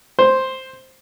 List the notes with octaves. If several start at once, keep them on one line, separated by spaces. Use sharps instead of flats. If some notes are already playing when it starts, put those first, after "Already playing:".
C5